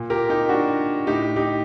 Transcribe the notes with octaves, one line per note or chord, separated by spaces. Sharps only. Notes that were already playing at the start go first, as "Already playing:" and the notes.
Already playing: A#2
G4 A#4
D#4 G4
D4 F#4
A2 D#4 G4
D#4 G4